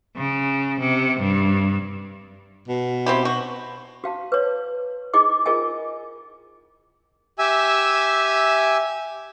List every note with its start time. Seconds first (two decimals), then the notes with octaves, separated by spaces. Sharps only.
0.17 C#3
0.80 C3
1.20 G2
2.68 B2
3.06 C4 E4 G4
3.25 F#4
4.04 F#4 F5 A5
4.32 B4 C#5
5.14 D#4 E4 G#4 D#5 D6
5.46 F4 G#4 A#4 D#5 G#5
7.39 G4 E5 G#5 E6